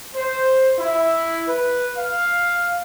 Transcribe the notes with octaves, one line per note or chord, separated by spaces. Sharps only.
C5
E4
B4
F5